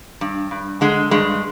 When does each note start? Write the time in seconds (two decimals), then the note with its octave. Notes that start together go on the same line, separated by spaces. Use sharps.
0.21 G2
0.51 G2
0.81 D3 G#3
1.11 G2 G#3